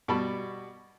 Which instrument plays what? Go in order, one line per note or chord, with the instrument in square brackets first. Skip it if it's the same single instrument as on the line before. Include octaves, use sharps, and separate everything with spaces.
[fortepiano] B2 G3 A5 B5